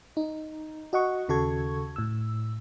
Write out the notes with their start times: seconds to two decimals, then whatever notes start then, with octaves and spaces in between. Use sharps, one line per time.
0.17 D#4
0.93 F#4 D#5 F#5 C#6
1.29 D#2 C#3 F#4 A4 C#6 G#6
1.96 A2 E6